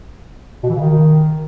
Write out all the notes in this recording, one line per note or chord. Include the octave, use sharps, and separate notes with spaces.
B2
E3
C#3
D#3